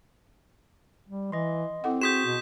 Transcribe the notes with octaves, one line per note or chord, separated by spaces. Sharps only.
G3
E3 D#5 C6
C4 E4 A4 F#5
F#4 G#4 C6 D#6 G6 B6 E7
B2